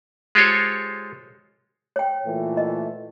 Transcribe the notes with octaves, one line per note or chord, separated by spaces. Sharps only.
G#3 F4 G4 A4 C5 C#5
C#5 G5
A#2 E3 A3
D#5